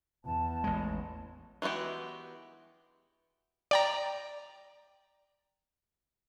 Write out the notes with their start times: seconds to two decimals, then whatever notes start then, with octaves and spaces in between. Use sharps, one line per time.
0.25 E2 A5
0.64 A1 G#3
1.62 E3 G#3 B3 F#4 G4
3.71 D5 G5 A#5